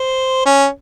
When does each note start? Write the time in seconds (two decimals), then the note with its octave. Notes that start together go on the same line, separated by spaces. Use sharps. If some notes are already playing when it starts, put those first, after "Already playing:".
Already playing: C5
0.45 C#4